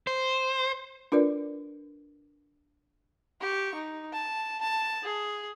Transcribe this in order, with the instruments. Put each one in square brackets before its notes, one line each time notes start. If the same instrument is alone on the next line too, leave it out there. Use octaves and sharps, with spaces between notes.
[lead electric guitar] C5
[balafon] D4 F4 A#4 B4 D5
[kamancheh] G4 C#6
D#4
A5
A5
G#4